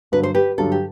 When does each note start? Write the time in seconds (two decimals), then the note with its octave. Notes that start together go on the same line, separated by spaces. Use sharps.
0.12 G2 D3 F#3 B4
0.23 C5
0.35 G4 B4
0.58 G2 D3 F#3 A4
0.72 G4